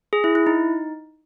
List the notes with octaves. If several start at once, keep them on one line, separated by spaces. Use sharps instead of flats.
G#4
E4
E4
D#4